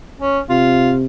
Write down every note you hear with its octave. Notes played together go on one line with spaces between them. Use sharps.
C#4
C3 F4